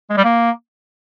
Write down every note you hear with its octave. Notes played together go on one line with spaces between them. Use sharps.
G#3
G3
A#3